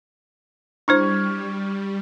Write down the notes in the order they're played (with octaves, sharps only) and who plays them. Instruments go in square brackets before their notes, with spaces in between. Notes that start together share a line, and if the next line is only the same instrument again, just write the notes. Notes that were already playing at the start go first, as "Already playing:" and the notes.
[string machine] G3 [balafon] D4 E4 C5 [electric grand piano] C#6 F6 G#6